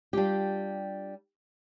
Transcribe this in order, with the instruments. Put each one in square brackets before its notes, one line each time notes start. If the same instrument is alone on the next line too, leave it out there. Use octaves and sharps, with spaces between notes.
[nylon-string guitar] G3 D4 F4 G4